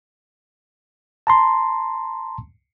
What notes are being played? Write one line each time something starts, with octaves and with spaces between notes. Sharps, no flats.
A5 A#5 C6